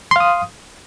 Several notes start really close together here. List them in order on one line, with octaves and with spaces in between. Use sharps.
C6 F5 D#6